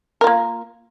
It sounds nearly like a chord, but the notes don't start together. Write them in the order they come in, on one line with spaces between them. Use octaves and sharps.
A#4 F4 A#3